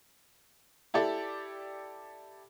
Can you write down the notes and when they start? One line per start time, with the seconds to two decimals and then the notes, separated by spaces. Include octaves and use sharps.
0.94 E4 G4 A4 D5